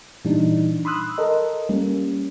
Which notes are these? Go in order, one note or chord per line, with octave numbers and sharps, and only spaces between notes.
A#2 E3 G3 D4 D#4
B5 C6 D#6 E6 F#6
A4 A#4 D#5
G3 A#3 C#4